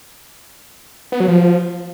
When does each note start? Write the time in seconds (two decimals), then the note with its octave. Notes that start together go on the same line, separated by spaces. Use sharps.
1.12 B3
1.20 F#3
1.28 F3